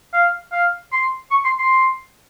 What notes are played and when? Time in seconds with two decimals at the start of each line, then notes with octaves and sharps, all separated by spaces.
0.13 F5
0.52 F5
0.92 C6
1.31 C#6
1.45 C6
1.58 C6